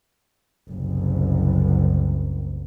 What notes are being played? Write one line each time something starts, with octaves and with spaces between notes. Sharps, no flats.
F#1 C2